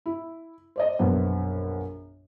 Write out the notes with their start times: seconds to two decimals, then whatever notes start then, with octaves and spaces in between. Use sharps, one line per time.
0.06 E4
0.76 C5 D5 D#5
0.99 A#1 F#2 B2 B3 F#4 C5